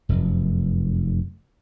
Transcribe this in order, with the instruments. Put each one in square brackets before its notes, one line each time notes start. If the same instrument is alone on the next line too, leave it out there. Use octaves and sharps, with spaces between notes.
[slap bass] F1 F#2